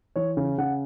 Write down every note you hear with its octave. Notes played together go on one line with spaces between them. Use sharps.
E3 C#5
C#3
C#3 F#5